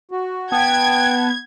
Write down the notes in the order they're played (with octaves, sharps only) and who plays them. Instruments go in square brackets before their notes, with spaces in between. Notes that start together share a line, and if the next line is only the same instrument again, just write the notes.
[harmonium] F#4
[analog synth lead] B3 [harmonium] F#5 A5 [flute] G5 [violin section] G#6